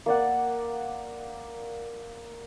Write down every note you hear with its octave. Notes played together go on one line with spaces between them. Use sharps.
A#3 D5 F#5